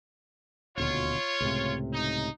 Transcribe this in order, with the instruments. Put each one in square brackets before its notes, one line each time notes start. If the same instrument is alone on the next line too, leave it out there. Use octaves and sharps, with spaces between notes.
[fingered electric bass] D#1 D2 B2 [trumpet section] F4 C#5
[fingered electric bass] C#2 A2 C3
[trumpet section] D#4